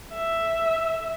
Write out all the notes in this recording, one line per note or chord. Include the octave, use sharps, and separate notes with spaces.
E5